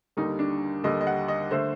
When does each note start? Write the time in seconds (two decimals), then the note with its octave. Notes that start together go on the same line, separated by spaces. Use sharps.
0.17 D#2 D3 G3 D#4
0.39 D4
0.84 D#2 D3 G3 D#5
1.01 D#5
1.07 F#5
1.28 D#5
1.51 D3 A3 C5